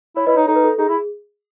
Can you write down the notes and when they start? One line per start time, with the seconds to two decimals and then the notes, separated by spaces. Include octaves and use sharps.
0.16 E4 C#5
0.27 E4 B4 D#5
0.36 D#4 C#5
0.47 D#4 A4
0.56 B4
0.64 A4
0.78 D#4 G#4
0.89 E4